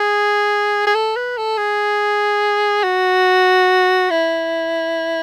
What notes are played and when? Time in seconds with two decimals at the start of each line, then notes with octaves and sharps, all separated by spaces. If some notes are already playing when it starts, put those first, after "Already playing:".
Already playing: G#4
0.87 G#4
0.95 A4
1.16 B4
1.37 A4
1.58 G#4
2.84 F#4
4.10 E4